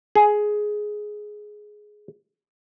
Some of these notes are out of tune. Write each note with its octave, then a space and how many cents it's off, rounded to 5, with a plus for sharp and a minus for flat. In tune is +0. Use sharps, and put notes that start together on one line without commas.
G#4 +10